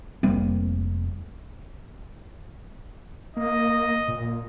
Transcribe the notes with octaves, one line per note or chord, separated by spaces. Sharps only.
F1 G3 A#3 C4
A#3 D#5
A#2